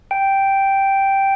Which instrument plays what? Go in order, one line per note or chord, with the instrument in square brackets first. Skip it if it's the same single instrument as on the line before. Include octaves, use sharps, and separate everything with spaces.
[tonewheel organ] G5